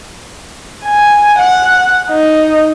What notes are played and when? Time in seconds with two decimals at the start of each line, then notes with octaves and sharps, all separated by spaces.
0.85 G#5
1.38 F#5
2.10 D#4